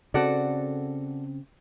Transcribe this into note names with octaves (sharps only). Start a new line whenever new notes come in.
C#3 C4 F#4 A4 D5